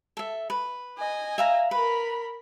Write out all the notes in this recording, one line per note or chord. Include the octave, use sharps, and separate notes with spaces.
A4 E5
B4
D#5 G#5
E5 F5 A#5
A#4 B4 B5